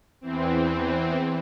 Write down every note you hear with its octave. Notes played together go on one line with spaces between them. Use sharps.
E2 E3 C4